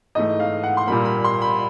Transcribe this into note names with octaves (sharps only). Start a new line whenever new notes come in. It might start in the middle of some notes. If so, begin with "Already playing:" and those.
G#2 E3 A3 D#5
F5
F#5
C6
A#2 G3 A#3 B5
B5
C6
B5